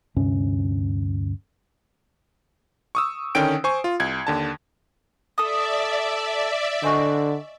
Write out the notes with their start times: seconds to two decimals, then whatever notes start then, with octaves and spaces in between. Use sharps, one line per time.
0.16 D2 G2 C3 C#4
2.95 C#6 D#6 E6
3.35 D3 D#3 C#4 G5 D7
3.64 C5 G#5 C#6
3.84 F4
4.00 C2 G#6
4.27 D#2 D3 A5
5.38 A4 D5 E5 D#6
6.83 D3 F#4 C5 D#5 G#5 C#6